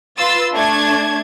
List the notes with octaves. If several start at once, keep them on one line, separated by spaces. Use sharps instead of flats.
F4 B4 C6 E6 A6
A3 D4 A5 G#6